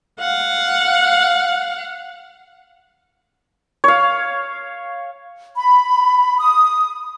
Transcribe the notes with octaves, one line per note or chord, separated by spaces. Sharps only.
F5 F#5
C#5 F5
B5
D#6